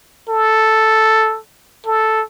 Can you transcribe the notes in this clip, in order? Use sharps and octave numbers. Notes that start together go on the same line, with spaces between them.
A4
A4